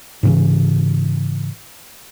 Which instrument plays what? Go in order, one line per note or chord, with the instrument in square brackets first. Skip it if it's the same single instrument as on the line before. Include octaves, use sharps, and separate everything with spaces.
[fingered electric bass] G#2 C#3 E3